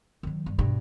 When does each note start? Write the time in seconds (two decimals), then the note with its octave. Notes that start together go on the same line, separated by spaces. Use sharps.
0.23 D#3 F#3
0.46 G2
0.59 G2 B2